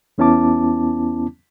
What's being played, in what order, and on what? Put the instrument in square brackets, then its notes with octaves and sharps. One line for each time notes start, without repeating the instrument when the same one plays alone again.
[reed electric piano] E2 B3 C#4 E4 A5 D6